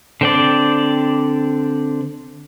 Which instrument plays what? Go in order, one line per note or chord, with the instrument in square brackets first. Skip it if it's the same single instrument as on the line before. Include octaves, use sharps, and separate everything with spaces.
[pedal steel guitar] D3 C4 D5